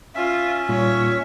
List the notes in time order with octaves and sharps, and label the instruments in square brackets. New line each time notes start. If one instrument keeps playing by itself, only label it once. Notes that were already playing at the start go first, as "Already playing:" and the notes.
[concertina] C#4 E5 [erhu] F4
[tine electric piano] A#2 G3 F4 [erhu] C#5